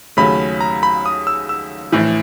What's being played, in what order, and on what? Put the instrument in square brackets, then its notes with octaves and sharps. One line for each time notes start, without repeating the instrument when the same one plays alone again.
[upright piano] D#2 C#3 F#3 A3 C#4 [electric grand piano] B5
[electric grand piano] A#5
B5
D#6
E6
E6
[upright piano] A#1 A2 E3